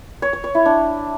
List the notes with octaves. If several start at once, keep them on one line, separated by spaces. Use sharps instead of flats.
C#5
C#5
C#5
E4
D4